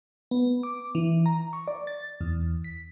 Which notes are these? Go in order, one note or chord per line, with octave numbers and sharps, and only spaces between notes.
B3
D6
E3
A#5
C#6
D5
A6
E2
B6